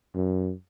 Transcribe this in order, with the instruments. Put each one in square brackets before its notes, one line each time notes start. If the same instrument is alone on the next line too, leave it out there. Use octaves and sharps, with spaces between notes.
[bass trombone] F#2